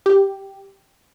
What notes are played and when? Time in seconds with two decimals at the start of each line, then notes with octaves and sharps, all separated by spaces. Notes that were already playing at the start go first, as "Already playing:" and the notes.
0.06 G4